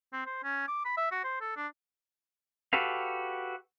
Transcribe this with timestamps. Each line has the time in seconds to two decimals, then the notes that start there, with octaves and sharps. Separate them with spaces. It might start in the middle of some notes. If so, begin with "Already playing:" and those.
0.13 C4
0.26 C5
0.44 C#4
0.68 D6
0.85 B5
0.97 E5
1.11 F#4
1.24 C5
1.41 A4
1.57 D4
2.73 F#4 G4 A4 B4 F5